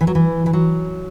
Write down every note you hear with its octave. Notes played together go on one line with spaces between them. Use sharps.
E3
F#3
E3
E3
F#3